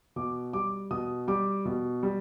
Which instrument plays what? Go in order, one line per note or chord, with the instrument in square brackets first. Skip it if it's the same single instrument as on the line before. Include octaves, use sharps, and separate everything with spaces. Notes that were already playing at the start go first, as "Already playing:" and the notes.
[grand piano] B2 D6
G3 D6
B2 D#6
G3 D6
B2
G3